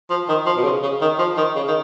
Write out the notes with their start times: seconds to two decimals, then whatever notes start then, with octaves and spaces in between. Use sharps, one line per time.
0.10 F3
0.29 D#3
0.46 F3
0.57 B2
0.65 C#3
0.83 C#3
1.01 D#3
1.19 F3
1.37 D#3
1.55 C#3
1.68 D#3